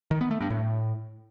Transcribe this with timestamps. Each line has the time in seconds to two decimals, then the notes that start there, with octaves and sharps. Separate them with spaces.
0.11 D#3
0.21 B3
0.31 A3
0.41 G2
0.50 A2